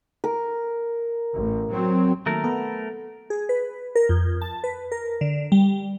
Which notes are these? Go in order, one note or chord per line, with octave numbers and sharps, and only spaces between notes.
A#4
A1
F#3 C4
D#3 F#3 A3 A#3 A#4
B3 A4
G#4
B4
A#4
F2
A5
B4
A#4
D3
G3